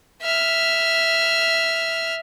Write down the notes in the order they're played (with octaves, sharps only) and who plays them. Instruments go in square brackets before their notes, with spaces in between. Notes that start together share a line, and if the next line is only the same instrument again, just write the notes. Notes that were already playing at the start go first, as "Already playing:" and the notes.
[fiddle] E5 F6